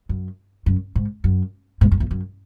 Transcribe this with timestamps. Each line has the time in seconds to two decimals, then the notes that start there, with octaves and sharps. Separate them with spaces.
0.09 F#2
0.66 F#2
0.95 G#2
1.24 F#2
1.81 G#2
1.92 F#2
2.00 E2
2.11 F#2